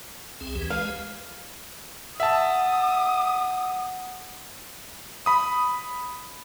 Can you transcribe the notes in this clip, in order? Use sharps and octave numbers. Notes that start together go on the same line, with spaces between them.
C2 C4 G#4
D#2 E3 G4
G#3 B4 F5
E5 F#5 A5 D#6
B5 D#6